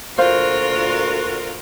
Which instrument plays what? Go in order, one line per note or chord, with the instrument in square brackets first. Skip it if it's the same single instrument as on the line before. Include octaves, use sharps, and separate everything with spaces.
[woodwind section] D2 A#2 F#4 [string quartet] F4 A#4 [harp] C5 F5 C6